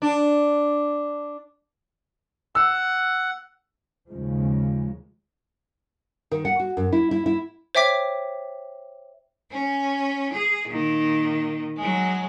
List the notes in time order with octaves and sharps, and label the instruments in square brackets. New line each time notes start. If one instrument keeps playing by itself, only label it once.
[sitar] D4
[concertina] F#5 [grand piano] E6
[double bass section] D#2 C#3 F3 G#3
[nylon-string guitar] D#3
F#5
F#4
F#2
E4
E4
E4
[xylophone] C5 C#5 E5 G5 D6 B6
[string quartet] C#4 G#5
G#4
A#2 D#3
F#3 G#3